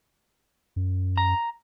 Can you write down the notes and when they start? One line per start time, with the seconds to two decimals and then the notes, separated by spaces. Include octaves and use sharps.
0.76 F#2
1.17 A#5